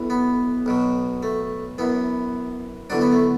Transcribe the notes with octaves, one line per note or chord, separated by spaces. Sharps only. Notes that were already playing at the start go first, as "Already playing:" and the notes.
Already playing: B1 A2 E3
B3
B1 B2 F#3
A3
F#2 E3 B3
E2 D3 F#3 D4
B3
A3